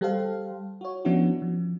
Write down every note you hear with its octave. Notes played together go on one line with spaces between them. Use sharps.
G3 G4 A4 C5 F5
F#4 C#5
F3 B3 C#4 D4 E4 F#4
F3